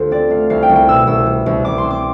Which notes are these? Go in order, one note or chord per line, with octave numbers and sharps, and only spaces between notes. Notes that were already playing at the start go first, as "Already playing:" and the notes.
Already playing: D2 F4 G4 A4 C5
C4 D5
A3 F5
C2 F5
G5
C2
G5
B2 E6
C2 E6
G3
C2
C2 D6
C6
C4
D6